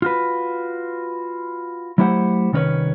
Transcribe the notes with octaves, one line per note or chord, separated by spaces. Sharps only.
F4 F#4 B4
F#3 A3 E4 G4 C5 F#5
C2 D#3 C#4 D#4 B4 C#5